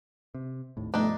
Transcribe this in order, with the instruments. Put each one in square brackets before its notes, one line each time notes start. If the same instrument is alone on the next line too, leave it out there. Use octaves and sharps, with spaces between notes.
[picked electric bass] C3
G#1 D#2 A2
[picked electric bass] G2 B2 F3 [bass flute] A3 [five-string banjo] D4 D#4